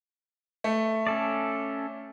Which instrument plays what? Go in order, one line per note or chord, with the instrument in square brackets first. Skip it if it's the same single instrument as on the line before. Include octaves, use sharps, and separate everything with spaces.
[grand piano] A3
[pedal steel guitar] C#4 A4 D5